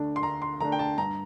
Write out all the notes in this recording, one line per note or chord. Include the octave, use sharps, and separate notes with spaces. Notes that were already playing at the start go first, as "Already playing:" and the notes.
Already playing: D2 D3 A3 D4
C6
D2 A#5
C6
D3 A3 D4 A#5
G5
A5
G2 A#5